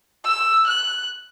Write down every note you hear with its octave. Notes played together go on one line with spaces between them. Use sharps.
E6
F#6